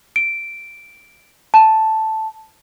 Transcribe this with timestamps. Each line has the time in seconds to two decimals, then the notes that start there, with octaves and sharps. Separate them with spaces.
0.16 D7
1.54 A5